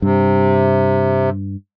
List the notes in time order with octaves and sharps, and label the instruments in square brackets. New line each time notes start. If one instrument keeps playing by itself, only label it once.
[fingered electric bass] G2 [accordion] C3